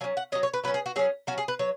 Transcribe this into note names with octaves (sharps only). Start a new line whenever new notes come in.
F#3 C#4 G#5
F#5
F#3 C#4 D#5
C#5
B4
F#3 C#4 B4
G#4
F#4
F#3 C#4 G#4
F#3 C#4 F#4
G#4
B4
F#3 C#5